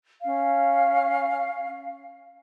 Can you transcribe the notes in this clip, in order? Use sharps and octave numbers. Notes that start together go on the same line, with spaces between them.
C#4 F5